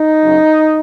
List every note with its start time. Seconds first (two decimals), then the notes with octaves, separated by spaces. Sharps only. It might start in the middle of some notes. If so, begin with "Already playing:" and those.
Already playing: D#4
0.23 F#2 C#3 F#3